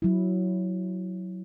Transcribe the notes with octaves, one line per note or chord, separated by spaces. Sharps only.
F#3 E4